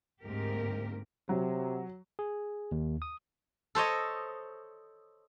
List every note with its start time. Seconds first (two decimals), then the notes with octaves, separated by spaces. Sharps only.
0.23 D2 G#2 A#3 C4 G4 A#4
1.29 C3 F#3
2.19 G#4
2.72 D#2
3.02 D#6
3.75 A4 C5 C#5 D#5